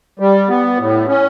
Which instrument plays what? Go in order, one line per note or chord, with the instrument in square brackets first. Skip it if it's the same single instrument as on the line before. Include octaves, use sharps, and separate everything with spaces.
[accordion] G3
B3
A2
C#4